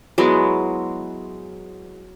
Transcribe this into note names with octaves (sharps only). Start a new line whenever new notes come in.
F#3 G#3 B3 E4